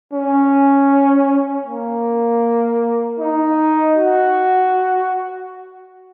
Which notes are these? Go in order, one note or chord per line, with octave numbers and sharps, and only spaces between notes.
C#4
A#3
D#4
F#4